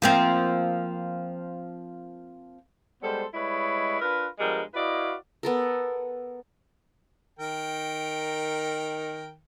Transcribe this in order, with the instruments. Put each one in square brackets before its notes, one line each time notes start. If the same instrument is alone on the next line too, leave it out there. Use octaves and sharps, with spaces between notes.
[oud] F3 A#3 C4
[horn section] G3 G#3 B3 A4 C5
G3 G#3 E4 B4 C#5 D#5
D4 F4 A#4 B4
G2 F3 G3 G#3 B3 A#4
E4 F#4 B4 D5 D#5 F5
[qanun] B3 A4 A#4
[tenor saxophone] D#3 [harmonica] A#4 G5